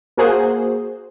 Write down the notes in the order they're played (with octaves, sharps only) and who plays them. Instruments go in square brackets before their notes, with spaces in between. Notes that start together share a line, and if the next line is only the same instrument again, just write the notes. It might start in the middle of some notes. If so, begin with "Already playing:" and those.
[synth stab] A#3 F#4 G#4 C5